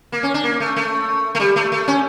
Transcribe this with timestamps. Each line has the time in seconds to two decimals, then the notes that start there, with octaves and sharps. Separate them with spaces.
0.12 A#3
0.23 C#4
0.34 D4
0.44 A#3
0.60 A3
0.76 A3
1.35 A3
1.40 G3
1.56 A3
1.72 A3
1.88 C#4